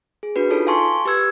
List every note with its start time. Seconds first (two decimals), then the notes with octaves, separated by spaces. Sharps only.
0.23 G#4
0.36 D4 F#4 B4
0.50 D#4 F4 A4 C#5
0.67 F5 G#5 A5 C6 C#6
1.05 G4 B4 E6 G#6